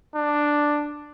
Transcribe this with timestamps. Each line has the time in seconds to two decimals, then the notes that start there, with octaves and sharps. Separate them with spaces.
0.16 D4